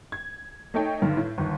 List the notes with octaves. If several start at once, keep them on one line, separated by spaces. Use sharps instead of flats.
G#6
A3 D#4 A4 C#5 G5
G2 D3 D#3
A2
G1 D#2